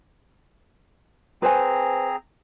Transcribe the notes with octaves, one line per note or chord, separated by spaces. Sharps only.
C4 G#4 B4 C5 G#5 A#5